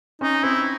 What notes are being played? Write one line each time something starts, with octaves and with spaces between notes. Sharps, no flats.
C#4 D#4
C4 E4